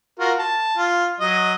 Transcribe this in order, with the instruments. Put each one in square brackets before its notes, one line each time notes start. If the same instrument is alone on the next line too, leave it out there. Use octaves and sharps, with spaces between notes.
[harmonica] F4 F#4 A#4
A5
F4
F#3 D#5